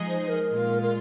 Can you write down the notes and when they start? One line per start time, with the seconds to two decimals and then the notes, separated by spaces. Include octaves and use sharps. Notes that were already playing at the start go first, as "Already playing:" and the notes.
Already playing: F3 G#3 D#4 G#4 D#5
0.08 C5
0.29 A#4
0.50 A#2 G#3 F4
0.83 A#4